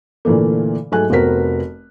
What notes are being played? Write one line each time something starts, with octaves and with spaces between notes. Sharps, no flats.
A#2 D3 E3 A3 A#3
G#2 F#3 A3 A4 G#5 F#6
F1 B3 C4 F#4 A#4 B6